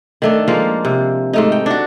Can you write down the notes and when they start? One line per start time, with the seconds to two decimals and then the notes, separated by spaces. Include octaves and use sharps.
0.22 D#3 A3 D4
0.48 F3 G#3 A#3 F5
0.85 C3
1.33 G#2 A3 D#4
1.52 G5
1.66 D4 F#4